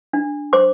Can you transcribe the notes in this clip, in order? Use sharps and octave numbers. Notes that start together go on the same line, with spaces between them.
D4
C5 D6